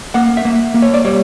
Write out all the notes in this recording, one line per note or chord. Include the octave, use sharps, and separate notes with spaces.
A#3 F#5
E5
A#3
A#3
C#5
D5
G3 C#5